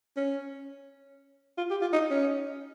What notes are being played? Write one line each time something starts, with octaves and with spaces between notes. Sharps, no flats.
C#4
F4
G4
F4
D#4
C#4